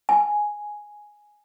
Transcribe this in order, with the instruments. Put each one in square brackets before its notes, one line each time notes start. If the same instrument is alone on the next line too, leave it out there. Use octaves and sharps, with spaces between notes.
[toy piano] G#5